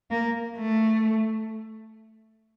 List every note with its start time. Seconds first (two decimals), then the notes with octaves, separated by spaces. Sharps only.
0.11 A#3
0.57 A3